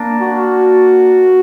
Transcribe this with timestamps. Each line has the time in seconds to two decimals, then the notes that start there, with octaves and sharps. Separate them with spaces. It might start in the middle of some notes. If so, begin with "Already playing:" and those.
Already playing: A#3 D4
0.21 F#4